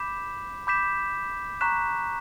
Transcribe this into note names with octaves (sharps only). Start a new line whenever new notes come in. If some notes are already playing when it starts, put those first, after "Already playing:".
Already playing: B5 D6 G6 B6 E7
B5 D6 G6 B6 E7
A#5 C#6 F#6 B6 E7